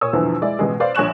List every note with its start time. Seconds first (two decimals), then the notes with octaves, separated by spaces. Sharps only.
0.01 A#2 C#5 D#6 E6
0.13 E2 G2 B2 D3 E3 F3
0.42 G#3 E4 D5
0.59 A1 B2 G#3
0.80 B4 C5 D5 F5
0.95 A#1 C#5 G#5 C#6 F#6 E7